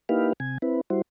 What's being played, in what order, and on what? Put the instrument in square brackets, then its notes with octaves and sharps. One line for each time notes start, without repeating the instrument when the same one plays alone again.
[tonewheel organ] A#3 D#4 E4 G4 B4 F5
C3 G#5
C4 E4 B4
G3 E4 F#4 C5